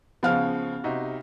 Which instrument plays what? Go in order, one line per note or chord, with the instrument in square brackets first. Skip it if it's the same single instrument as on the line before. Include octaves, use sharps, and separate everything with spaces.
[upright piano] C#3 F3 [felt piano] B3 F5 F6
[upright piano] C3 D#4 F#4